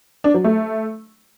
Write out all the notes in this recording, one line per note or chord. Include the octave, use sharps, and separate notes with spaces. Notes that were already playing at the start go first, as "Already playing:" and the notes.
D4
F#3
A3